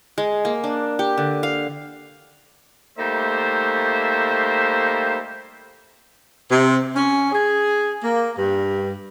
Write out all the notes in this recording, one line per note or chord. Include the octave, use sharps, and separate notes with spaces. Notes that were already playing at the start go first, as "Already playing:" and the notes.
G#3
A#3
D4
G4
D3
F5
G3 A3 A#3 D#4 C5 E5
C3
C#4
G#4
A#3
G2